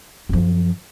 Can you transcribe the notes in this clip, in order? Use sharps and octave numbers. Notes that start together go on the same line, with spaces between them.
F#2 F3